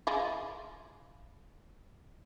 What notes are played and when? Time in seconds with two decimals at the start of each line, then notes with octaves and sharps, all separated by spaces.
0.07 G#3 E4 F4